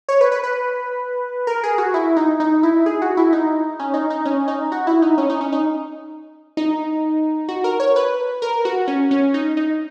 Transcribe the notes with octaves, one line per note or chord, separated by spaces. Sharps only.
C#5
B4
B4
B4
A#4
G#4
F#4
E4
D#4
D#4
E4
G#4
F#4
E4
D#4
C#4
D#4
D#4
C#4
D#4
F#4
E4
D#4
C#4
D#4
C#4
D#4
D#4
F#4
A#4
C#5
B4
A#4
F#4
C#4
C#4
D#4
D#4